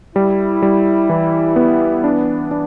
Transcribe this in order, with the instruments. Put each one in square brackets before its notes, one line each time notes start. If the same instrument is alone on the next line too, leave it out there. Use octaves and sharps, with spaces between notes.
[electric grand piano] G3 [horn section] E4
[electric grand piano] G3
E3
B3
D4
D4